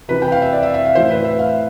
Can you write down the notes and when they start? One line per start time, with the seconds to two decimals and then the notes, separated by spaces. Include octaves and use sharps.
0.08 C3 E3 B4
0.22 G5
0.32 F5
0.42 E5
0.52 D5
0.63 E5
0.74 E5
0.85 F5
0.95 A2 E3 C5
1.10 B4
1.24 E5
1.39 F5